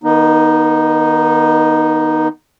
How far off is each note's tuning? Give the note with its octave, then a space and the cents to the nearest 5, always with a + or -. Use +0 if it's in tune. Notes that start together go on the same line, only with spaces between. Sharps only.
D#3 +0 B3 -35 D#4 +0